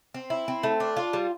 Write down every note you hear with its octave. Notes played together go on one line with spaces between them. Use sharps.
C4
E4
C4
A3
D4
F4
G3